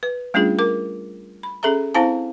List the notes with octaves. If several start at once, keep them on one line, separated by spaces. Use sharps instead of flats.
B4
G3 A3 C#4 D4 F4 G#4
A#4 D6
B5
C#4 G#4 A4 E5 A#5
C4 E4 C5 F5 G#5 A5